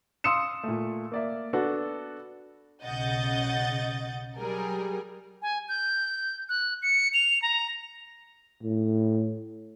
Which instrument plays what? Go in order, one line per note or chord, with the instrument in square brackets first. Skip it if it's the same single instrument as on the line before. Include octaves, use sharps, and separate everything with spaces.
[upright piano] F5 C6 D#6 E6 C#7 E7
A#2 A3
A#3 D5 E5
B3 D4 F#4 A4
[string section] B1 C#3 D#5 F#5 G6 A6
F#3 G3 G#4 A#4
[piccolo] G#5
G6
F#6
C#7
F7
A#5
[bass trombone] A2